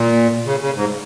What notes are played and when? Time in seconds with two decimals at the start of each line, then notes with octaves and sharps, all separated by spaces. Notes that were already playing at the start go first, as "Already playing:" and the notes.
Already playing: A#2
0.46 C#3
0.60 C#3
0.75 G#2